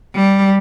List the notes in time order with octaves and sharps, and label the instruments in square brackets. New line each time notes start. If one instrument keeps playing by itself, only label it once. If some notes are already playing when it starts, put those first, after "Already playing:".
[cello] G3